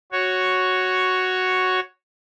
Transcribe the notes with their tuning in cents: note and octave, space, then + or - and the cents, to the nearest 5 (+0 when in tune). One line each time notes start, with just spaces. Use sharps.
F#4 +0 C#5 +0